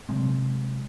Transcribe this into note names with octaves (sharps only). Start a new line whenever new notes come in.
C3 F#3 G#3 C4